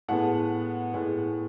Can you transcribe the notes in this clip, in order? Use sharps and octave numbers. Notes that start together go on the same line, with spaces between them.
A2 G#3 B3 F#5 A5
A2 G#3 B3